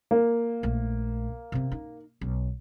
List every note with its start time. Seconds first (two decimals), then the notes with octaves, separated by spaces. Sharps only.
0.11 A#3
0.63 A#1 A3
1.52 C3 C4
1.72 D#4
2.21 B1